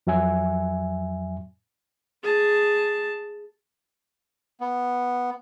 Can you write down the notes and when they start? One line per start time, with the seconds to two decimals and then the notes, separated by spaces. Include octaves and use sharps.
0.07 F2 F#3 E5 G#5
2.23 G#4 A5
4.61 B3